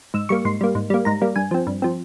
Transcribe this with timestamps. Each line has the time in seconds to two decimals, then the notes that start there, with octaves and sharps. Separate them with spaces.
0.14 G#2 E6
0.29 G3 A#3 C#6
0.45 G#2 C6
0.61 G3 A#3
0.75 G#2
0.90 G3 A#3
1.05 G#2 A#5
1.22 G3 A#3
1.36 G2 G#5
1.51 F3 C4
1.67 G2
1.82 F3 C4